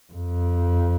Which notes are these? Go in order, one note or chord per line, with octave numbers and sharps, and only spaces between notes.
F2